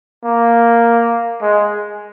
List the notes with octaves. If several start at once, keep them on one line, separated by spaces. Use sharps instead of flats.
A#3
G#3